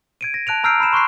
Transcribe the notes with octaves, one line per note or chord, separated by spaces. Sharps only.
G#6 D7 D#7
A#6
A5 F#6 D7 F7
A#5 E6 F6 G6 C7 D7
B5 C7 E7
C6 C#6 F#6 C7